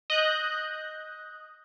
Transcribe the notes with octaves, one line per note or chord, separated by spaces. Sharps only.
D#5 F#6 G6